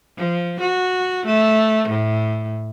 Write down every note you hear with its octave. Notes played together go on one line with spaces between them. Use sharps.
F3
F#4
A3
A2